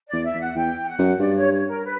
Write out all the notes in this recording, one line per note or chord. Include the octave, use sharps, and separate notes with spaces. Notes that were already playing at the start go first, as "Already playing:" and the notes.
E2 D5
E5
E2
F#5
E2 G5
F#5
F#2
G2 D5
C#5
C#5
A#4
B4